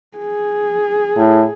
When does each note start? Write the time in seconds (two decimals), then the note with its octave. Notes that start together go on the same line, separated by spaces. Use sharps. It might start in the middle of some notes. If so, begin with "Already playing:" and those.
0.18 G#4
1.17 A2